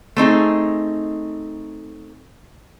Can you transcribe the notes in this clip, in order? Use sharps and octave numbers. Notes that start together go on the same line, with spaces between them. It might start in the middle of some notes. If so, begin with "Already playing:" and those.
A3 C4 D#4 G#4